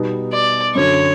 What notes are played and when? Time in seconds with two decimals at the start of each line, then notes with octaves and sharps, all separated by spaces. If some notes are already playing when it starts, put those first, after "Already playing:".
Already playing: B2 G3 B3 D#4 F#4
0.33 D5
0.75 F#2 D3 F#3 C#5